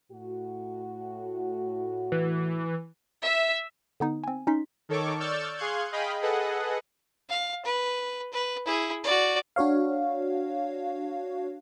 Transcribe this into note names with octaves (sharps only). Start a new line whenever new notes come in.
A2 F#4
E3
E5
D3 B3 D#4 D#6
C4 G#5
C#4 D#4 C6 B6
D#3 A4 C#5 C#6 D6
D5 C#6 E6 F6 G6 A6
G#4 F5 C6 C#6 F#6 G#6
G#4 D#5 F5 G5 B5
G#4 A4 B4 D#5 F#5
F5
B4
B4
E4 G#4
F#4 D5
D4 F#4 C#5 F5